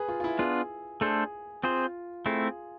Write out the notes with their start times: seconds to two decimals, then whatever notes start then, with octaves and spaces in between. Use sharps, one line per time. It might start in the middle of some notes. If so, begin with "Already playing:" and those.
Already playing: G#4 B4
0.08 F4
0.20 F4
0.24 E4
0.39 B3 D4 F4 G#4
1.01 A3 D4 G#4 A4 C5
1.63 C4 F4 G#4 C5
2.25 A3 C4 E4 G#4